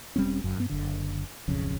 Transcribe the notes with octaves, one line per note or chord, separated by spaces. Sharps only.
E1 G3 C4 C#4
F#1 F#2
G2 B3
F#1 D3
D1 B1 F2 C#3